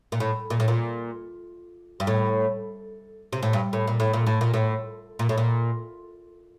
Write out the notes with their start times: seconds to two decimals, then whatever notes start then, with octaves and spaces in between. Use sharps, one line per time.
0.12 A#2
0.20 A2
0.50 A#2
0.60 A2
0.68 A#2
2.00 G2
2.07 A2
3.33 C3
3.43 A2
3.53 G2
3.73 A2
3.87 A#2
4.00 A2
4.13 A#2
4.27 A2
4.41 A#2
4.54 A2
5.19 A#2
5.29 A2
5.38 A#2